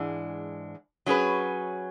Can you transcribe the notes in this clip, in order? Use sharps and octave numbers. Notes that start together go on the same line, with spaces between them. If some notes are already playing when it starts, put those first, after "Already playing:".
Already playing: G#2 E3 G#3 D4
F#3 C#4 G#4 B4